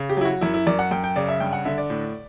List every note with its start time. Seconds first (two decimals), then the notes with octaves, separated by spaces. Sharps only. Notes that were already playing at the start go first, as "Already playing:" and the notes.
Already playing: C#3
0.10 G4
0.17 F#3 E4
0.25 F#4
0.41 F#2 E4
0.54 E4
0.67 F#2 D5
0.79 F#5
0.91 F#2 G5
1.04 G5
1.16 C#3 D5
1.29 E5
1.40 G2 G5
1.53 F#5
1.65 D3 E5
1.78 D5
1.90 A2